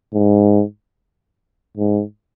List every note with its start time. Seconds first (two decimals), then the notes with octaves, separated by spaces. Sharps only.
0.14 G#2
1.78 G#2